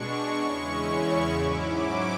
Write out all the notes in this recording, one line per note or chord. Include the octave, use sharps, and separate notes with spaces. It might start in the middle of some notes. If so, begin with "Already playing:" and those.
Already playing: B2 G#3 D4 C#6
E2 C#3 G#3 C#4 E4
G#2 F#3 C#4 E4 D6